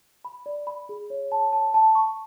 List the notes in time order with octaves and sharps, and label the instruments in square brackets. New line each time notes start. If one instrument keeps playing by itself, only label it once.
[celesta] B5
D5
B5
G#4
C#5
A5
A5
A5
C#6